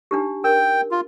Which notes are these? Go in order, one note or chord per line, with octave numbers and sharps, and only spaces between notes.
D4 D#4 G4
A#4 G5
F4